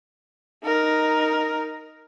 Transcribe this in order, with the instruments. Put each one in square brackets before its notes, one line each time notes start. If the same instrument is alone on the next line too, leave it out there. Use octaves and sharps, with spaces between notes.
[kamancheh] D#4 A#4